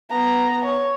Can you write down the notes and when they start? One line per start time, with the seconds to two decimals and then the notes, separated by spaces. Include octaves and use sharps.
0.10 B3 A#5
0.65 C#5